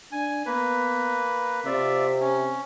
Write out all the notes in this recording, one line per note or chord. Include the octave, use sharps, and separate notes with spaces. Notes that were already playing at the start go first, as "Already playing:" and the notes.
D4 G#5
A#3 B3 B4
C3 F4 D5 E5
C#4